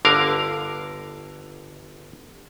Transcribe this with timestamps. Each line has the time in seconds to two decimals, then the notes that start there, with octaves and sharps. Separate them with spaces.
0.05 G1 D3 A#4 F5